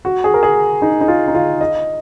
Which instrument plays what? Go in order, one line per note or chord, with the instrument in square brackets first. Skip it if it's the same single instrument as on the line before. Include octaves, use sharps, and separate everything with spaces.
[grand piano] F#4
G#4
A#4
G#4
D#4
D#4
F4
D#4
F4
D#5